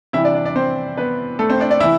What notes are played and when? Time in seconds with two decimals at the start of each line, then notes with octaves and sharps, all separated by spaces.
0.13 C3 E3 G3 E4 E5
0.24 D4 D5
0.35 D4 D5
0.45 D4 D5
0.56 C4 C5
0.97 B3 B4
1.39 A3 A4
1.50 C4 C5
1.60 D4 D5
1.70 D4 D5
1.80 C3 E3 E4 E5